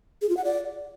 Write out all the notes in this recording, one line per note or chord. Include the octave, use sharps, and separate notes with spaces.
G#4
F4
F#5
D5